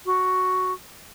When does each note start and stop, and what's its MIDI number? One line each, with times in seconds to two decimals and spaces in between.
0.06 0.73 66